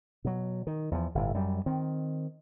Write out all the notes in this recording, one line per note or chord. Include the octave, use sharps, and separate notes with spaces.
B2 F#3
D#3
E2 F3
G1 A2
F#2 G3
D#3 C4